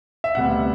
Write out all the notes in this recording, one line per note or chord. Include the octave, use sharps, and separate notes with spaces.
E5
D2 C3 G3 B3 F#5